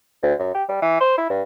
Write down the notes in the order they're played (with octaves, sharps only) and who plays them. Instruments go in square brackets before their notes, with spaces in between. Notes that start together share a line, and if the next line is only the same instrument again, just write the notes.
[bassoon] D2
F#2
G4
G3
E3
C5
E4
G2